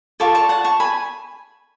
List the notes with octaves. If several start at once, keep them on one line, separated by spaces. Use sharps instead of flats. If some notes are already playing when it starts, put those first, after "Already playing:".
F4 A4 D5 A5 C#6
A5 C#6
F#5 A5
A5 C#6
G#5 B5